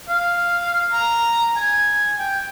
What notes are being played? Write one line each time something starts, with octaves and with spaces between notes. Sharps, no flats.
F5
A#5
G#5
G5